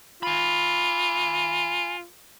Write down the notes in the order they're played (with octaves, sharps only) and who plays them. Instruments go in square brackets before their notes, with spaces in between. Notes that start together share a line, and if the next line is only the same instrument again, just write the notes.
[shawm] F4 [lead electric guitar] G#5 B5